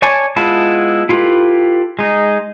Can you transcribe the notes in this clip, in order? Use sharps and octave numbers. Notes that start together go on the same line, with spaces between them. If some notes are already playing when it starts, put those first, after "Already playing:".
C#5 D5 G#5 A5 C#6
G#3 B3 E4 F4 A5
E4 F4 G4 A4 B4
G#3 D#4